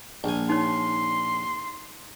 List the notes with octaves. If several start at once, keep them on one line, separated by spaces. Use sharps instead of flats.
A#1 G#5
D#4 C#5 C6